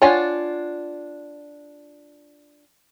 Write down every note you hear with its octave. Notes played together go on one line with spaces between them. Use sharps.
D4 F4 C#5 F#5 G#5